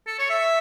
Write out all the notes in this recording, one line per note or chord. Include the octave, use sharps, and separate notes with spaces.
A4
C#5
E5